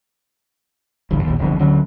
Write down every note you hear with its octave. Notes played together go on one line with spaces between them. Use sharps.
A1 D2 G2
A#1 D#2
E1 C2 F2 D3
D2 D3 F#3 C#4